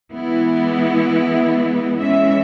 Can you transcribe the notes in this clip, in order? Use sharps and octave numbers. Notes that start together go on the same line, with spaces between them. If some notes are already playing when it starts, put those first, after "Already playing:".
E3 G#3 B3 E4
E3 G#3 C#4 E5